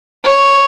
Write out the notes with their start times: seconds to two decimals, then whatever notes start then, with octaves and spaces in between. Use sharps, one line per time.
0.24 C#5